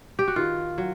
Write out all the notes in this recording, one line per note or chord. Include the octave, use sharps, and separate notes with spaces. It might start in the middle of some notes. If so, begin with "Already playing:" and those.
G4
F#4
D#3 F4
F#3